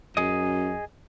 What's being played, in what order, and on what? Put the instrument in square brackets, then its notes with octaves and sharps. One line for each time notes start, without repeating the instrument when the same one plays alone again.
[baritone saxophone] F#2 [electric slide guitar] G#4 D#5